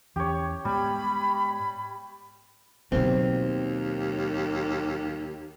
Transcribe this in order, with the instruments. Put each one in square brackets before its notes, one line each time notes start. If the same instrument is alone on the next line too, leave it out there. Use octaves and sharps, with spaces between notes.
[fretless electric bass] E2 E3 C#4 [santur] G4 C#5
[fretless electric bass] G#2 G#3 B3 [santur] G3 [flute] B5
[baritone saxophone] D#2 [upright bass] B2 F#3 [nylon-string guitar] C4